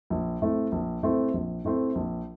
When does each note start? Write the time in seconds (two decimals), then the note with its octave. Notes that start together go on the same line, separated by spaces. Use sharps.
0.10 A#1
0.42 A2 A3 C4
0.72 A#1
1.03 A2 A3 C4
1.34 A#1
1.65 A2 A3 C4
1.95 A#1